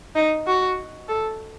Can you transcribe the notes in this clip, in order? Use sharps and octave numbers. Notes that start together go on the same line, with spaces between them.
D#4
F#4
A4